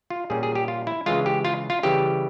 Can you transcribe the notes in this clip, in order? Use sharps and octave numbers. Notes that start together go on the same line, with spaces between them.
F4
A#2 G3 C#4 G#4
G#4
G4
F4
E4
C#3 E3 G#3 F4
G4
F4
F4
C#3 E3 G3 G4